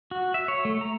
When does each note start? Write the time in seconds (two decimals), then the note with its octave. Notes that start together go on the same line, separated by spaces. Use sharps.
0.11 F#4
0.34 E5
0.48 C#5
0.65 A3
0.81 A#5